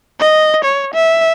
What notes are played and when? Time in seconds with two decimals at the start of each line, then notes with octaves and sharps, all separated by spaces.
0.20 D#5
0.64 C#5
0.94 E5